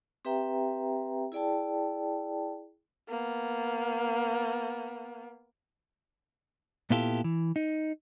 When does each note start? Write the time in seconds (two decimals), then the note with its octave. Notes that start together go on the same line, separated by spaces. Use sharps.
0.25 C4 G4 B4 E5 G5 A#5
1.32 E4 G#4 D5 G5 A5
3.08 A#3 B3
6.90 A#2 B3 E4 F4 G4 A4
7.24 E3
7.56 D#4